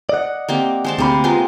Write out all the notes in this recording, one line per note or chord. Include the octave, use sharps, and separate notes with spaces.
D5 D#5 F#5
A#3 C4 G4
G#3 C5 A5
D2 C3 A#3 B5
G#3 B3 F4 A#5